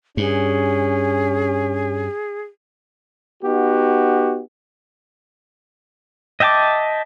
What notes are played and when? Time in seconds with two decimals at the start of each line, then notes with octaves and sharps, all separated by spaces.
0.17 G2 C#4 G#4
3.43 B3 D#4 F#4 G4
6.40 D#5 E5 G5 A5 D6